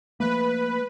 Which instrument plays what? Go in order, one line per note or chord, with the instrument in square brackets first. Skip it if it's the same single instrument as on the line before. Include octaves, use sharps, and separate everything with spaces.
[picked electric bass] F3 A3 A#3 [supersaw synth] B4